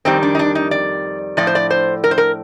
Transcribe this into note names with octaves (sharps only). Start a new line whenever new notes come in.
F2 D#3 G3 C4
D4
D#4
D4
D#4
D5
A2 F3 D5
C5
D5
C5
A#4
C5
A#4